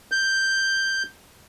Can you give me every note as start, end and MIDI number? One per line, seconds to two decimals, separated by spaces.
0.12 1.03 91